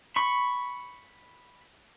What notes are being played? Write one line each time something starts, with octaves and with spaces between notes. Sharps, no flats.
B5 C#6